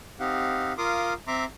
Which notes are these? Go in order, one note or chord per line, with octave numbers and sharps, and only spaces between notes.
C4 D#4 G4 F5 F#5
F4 A#4 F5 C6 D6 D#6
C4 E5 A#5 C6 D6